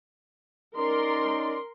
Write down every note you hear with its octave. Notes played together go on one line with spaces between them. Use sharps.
C#4 D#4 A#4 D5 C6